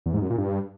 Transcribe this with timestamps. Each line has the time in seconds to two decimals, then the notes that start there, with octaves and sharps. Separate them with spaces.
0.06 E2
0.14 G#2
0.22 F#2
0.30 A#2
0.38 G2